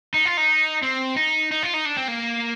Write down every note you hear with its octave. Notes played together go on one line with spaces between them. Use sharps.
D#4
F4
D#4
C4
D#4
D#4
F4
D#4
D4
C4
A#3